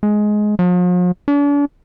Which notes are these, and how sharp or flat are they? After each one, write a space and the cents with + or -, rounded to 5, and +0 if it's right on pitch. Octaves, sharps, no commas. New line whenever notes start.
G#3 +15
F3 +45
D4 -40